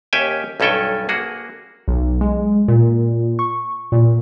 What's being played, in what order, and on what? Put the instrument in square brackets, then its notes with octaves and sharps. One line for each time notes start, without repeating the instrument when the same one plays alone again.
[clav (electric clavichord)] D#2 C#4 G4 E5 G5 G#5
B1 G2 C#4 A4 G5 G#5
A#3 F#4 G#4
[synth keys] B1
G#3
A#2
C#6
A#2